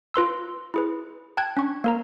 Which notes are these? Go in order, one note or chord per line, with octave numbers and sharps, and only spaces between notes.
F4 B4 C6 E6
E4 G#4 B4
G5 A5 F#6 G#6
C#4 D4 C#6
A#3 A#4 A#5